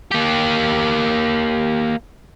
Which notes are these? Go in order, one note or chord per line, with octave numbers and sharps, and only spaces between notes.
A#3 G4